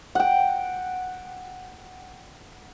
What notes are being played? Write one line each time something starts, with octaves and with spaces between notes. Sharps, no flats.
F#5 G5